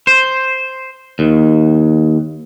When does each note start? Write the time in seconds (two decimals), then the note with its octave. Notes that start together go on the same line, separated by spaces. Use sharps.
0.07 C5
1.19 D#2